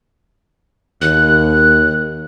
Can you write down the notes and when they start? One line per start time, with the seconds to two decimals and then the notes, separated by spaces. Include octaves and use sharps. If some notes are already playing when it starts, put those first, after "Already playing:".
1.01 D#2 F#6